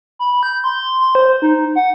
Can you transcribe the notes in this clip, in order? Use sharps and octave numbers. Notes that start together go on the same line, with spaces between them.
B5
G6
C6
C6
C5
D#4
F#5